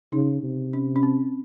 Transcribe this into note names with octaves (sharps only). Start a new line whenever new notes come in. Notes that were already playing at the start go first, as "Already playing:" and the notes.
C#3 D#4
C3
C#4
C#4
C4